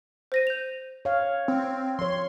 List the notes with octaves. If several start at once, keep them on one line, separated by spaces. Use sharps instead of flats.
C5 A#6 D#7
G6 F7
C#5 F5
C4
F3 C#5 C6